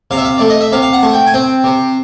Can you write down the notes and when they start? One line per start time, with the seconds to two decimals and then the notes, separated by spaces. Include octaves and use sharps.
0.11 C3 F5
0.17 E5
0.25 F5
0.38 A3 D5
0.50 D#5
0.61 E5
0.72 C3 F5
0.82 F5
0.93 F#5
1.03 A3
1.13 G5
1.27 G#5
1.34 C4 G5
1.64 C3